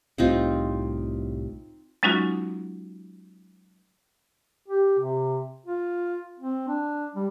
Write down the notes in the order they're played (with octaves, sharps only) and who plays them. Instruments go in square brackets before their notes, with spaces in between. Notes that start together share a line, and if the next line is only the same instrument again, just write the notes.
[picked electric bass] C2 A2 C3 [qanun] C4 D#4 F4
[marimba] F#3 G#3 C#4 D#4 F4 F#4
[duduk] G4
C3
F4
C4
D4
G3